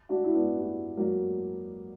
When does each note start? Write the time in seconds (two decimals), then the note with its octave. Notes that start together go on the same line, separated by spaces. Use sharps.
0.09 D4 F#4
0.24 E4
0.34 B3 D4
0.59 E4 G4
0.97 F#3 A#3